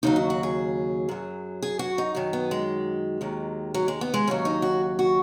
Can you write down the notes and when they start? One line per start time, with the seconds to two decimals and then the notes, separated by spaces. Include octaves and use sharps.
0.03 D#2 C#3 F#3 D#4
0.16 F#4
0.30 F#4
0.43 G#4
1.09 F#2 F#3
1.62 G#4
1.79 F#4
1.98 D#4
2.15 F#2 D#3 F#3
2.33 B3
2.51 G#3
3.21 D#2 D#3 F#3
3.74 F#3
3.88 G#3
4.01 B3
4.14 G#3
4.27 D#2 C#3 F#3 C#4
4.45 D#4
4.62 F#4
4.99 F#4